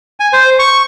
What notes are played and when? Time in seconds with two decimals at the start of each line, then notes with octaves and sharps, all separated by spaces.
0.20 G#5
0.33 C5
0.59 C#6